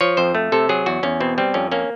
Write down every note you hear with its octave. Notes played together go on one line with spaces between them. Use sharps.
F3 C#5
F2 C5
A3
C3 A4
F#3 G#4
E2 F#4
E2 C#4
B2 C4
G3 C4
F2 C#4
A#3 C#4